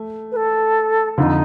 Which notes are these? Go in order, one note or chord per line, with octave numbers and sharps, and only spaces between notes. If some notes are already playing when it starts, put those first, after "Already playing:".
Already playing: A3
B4
A4
F2 D3 F3 D#4